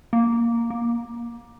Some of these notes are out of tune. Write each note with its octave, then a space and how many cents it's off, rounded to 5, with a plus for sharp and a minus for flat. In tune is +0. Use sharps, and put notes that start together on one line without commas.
A#3 +0
A#3 +20